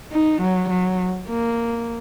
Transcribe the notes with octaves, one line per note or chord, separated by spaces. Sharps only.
D#4
F#3
F#3
A#3